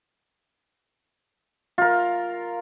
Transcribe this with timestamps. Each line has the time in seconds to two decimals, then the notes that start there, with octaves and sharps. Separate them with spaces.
1.78 F4 A#4